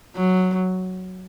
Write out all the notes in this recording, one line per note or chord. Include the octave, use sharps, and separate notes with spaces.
F#3